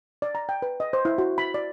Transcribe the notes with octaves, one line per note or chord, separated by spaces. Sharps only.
D5
A#5
G5
B4
D#5
C5
E4
F#4
B5
D5